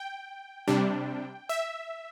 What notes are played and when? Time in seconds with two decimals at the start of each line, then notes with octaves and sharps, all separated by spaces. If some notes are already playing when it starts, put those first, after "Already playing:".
Already playing: G5
0.68 C3 G3 D4
1.49 E5